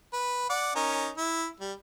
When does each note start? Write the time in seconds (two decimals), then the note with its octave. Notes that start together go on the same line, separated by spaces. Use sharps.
0.13 B4
0.49 D5 F#5
0.75 C#4 D#4 A#4
1.17 E4
1.60 G3